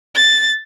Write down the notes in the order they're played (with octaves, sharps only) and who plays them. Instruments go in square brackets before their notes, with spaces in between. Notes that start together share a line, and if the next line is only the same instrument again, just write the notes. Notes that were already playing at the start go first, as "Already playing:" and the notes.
[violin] A6